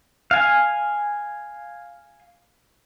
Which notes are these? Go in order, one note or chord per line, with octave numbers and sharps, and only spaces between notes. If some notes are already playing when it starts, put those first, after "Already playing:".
F5 G#5